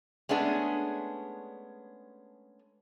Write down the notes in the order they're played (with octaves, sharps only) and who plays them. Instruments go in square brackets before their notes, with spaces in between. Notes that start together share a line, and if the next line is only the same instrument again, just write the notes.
[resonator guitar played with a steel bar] G#3 A3 B3 C#4 D4 G#4